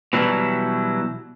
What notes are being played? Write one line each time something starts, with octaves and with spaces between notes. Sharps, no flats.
B2 E3 F#3 G3 E4